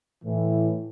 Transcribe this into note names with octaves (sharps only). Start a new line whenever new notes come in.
A2 E3